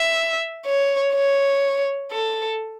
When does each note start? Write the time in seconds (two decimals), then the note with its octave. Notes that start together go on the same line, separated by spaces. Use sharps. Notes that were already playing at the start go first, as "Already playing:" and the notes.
Already playing: E5
0.66 C#5
1.14 C#5
2.12 A4